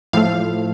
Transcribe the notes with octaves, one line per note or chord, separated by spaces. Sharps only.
A2 F3 A3 F5